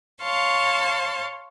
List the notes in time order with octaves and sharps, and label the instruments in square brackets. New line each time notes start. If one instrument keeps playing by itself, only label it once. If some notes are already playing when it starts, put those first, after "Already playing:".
[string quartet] C#5 F5 A5 C6